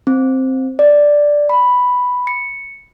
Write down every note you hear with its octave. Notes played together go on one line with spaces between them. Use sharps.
C4
D5
B5
C#7